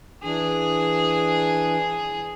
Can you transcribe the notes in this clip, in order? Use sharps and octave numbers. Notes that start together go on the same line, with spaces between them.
E3 D4 G#4